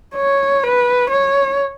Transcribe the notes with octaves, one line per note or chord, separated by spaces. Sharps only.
C#5
B4
C#5